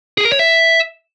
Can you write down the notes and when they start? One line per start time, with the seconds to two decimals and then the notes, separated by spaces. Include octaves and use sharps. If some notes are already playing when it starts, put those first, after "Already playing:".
0.18 G#4
0.25 A#4
0.32 C#5
0.39 E5